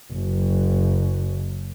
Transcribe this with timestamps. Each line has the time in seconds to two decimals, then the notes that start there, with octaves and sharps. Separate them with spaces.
0.13 F#1 F#2